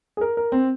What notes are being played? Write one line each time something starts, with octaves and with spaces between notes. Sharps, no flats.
G#4
A#4
A#4
C4